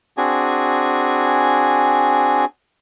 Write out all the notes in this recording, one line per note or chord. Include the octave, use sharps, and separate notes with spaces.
C4 D4 F#4 G#4 G#5